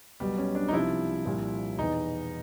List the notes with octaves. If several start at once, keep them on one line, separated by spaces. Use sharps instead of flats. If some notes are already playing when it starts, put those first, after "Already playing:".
B1 B2 G3
C#4
D4
D#4
C2 C3 F3 E4
C2 A#2 F3
E2 B2 D#4